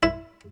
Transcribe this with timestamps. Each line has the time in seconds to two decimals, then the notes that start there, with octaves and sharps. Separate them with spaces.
0.03 E4